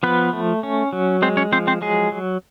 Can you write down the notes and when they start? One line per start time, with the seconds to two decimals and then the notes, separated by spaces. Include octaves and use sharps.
0.03 F3 B3 B4
0.33 A3
0.63 C#4
0.93 F#3
1.22 G#3 C4 C5
1.37 C#4 C#5
1.52 F3 C4 C5
1.67 C4 C5
1.81 F#3 G#3 G#4
2.12 F#3